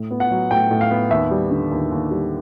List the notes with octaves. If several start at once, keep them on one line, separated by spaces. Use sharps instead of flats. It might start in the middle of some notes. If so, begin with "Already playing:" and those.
Already playing: A2
B3
F#5
F#3
A2 G5
A2
F5
B3
D#2 E5
G3
D3
D#2
D#2
G3